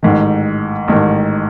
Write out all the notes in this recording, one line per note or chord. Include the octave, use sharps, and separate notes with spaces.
A1 G#2 D#3
A1 G#2 D#3